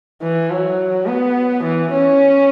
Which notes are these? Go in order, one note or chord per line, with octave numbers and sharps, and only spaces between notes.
E3
F#3
B3
E3
C#4